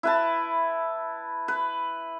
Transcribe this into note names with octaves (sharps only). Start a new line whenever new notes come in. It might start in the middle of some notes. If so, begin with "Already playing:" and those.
E4 B4 A5
B4